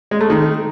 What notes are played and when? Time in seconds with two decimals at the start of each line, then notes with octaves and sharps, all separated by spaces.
0.11 G#3
0.21 A3
0.30 D#3